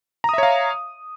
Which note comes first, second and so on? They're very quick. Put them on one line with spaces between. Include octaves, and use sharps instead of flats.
A#5 D#6 E5 C#5 F5